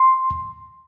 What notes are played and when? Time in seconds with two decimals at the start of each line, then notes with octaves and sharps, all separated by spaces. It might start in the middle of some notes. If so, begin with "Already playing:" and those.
Already playing: C6